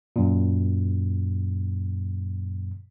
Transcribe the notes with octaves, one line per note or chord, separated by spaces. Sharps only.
F#2 A#2